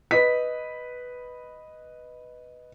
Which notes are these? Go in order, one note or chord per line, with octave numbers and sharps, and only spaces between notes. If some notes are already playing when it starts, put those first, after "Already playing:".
B4 D#5 B6